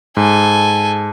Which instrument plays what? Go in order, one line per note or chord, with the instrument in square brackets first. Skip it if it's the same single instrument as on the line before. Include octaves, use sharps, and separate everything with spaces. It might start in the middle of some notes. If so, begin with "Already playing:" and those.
[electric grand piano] G#2 [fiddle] A4 G#5